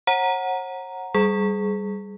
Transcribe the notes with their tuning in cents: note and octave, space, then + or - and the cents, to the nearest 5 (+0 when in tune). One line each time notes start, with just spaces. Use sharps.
C#5 -45 F#5 +0 A#5 +0
G3 +0 G#4 +25